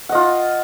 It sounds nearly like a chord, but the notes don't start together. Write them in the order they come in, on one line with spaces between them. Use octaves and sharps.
F#5 D#5 F4